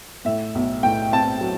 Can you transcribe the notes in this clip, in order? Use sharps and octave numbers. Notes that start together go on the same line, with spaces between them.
A2 E5
B1
A2 G5
C4 A5
F#3